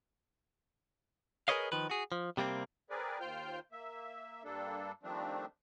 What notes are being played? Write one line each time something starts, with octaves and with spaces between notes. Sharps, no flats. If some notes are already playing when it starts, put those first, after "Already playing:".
G#4 A#4 B4 C#5 D#5 F5
D#3 F3 B4
F#4 G#4
F3
C3 G3 A#3 C4
C4 G#4 A#4 B4 D5
D#2 F4 C5 G5 F6 G6
A#3 E5
G2 G3 A#3 D4 A4
D#3 F3 G3 A3 C4 D4